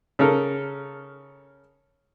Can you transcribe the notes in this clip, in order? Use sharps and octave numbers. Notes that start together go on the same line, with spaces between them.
C#3 A4 A#4